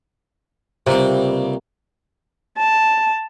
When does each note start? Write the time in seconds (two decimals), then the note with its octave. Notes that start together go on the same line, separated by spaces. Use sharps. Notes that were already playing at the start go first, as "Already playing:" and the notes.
0.87 C#2 C3 G3 A#3 C4
2.57 A5